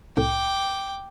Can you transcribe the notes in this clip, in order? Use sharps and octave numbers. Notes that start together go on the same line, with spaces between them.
C2 A2 G5 D6